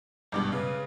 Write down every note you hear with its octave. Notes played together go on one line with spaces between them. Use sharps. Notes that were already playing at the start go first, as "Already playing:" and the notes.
G#1 G2 B2 D6
C#3 G#3 B4